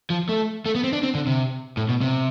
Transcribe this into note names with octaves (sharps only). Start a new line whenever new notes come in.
F3
A3
A3
B3
C4
D4
C4
D3
C3
A2
B2
C3